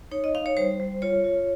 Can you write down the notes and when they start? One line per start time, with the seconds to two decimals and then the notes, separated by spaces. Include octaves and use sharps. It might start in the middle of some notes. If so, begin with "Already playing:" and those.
0.12 D#4 C#5
0.24 D#5
0.35 D#4 F5
0.46 C#5
0.57 G3 C5
0.80 G3
1.02 F4 C#5
1.24 F4